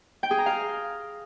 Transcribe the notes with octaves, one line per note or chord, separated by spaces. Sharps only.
G5
G#4
A#5
F5